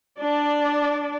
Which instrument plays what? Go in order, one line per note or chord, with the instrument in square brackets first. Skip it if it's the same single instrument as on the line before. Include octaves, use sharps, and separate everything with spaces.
[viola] D4 D5